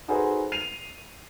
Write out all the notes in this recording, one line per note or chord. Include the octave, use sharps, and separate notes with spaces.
D#4 F#4 G#4 A4 B4 C5
C7 D#7 F7